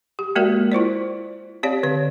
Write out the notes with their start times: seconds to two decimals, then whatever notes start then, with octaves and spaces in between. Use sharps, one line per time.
0.19 G4
0.36 G#3 A#3 F#4 A#4 D5
0.72 E4 F4 C5 D5
1.63 C4 G4 C#5 D5 F5
1.83 D3 C#5